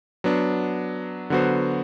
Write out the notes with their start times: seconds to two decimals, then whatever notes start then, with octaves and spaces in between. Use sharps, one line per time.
0.24 F#3 B3 D4
1.30 D3 F#3 B3 F#4 C5